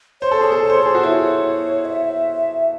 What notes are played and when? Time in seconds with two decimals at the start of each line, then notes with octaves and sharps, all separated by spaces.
0.21 C5 C#5
0.31 A4
0.41 G#4 C#5
0.52 A4
0.63 C#5
0.70 C5
0.77 A4
0.83 G#4 C5
0.95 F#4
1.03 E4 C#5
1.85 E5